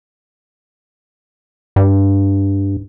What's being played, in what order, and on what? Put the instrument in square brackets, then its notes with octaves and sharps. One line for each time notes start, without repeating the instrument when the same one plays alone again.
[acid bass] G2